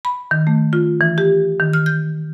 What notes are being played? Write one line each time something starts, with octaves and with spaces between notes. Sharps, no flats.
B5
D#3
A3
F4
E3
G4
D#3
F6
G6